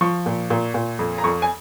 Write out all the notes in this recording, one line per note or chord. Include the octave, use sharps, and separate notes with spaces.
F3 C#6
A#2
A#2
A#2
F2
A#5
F2 C#6
G#5